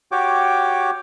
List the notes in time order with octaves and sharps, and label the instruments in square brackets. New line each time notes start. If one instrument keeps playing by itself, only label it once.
[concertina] F#4 G4 C#5 G5 D6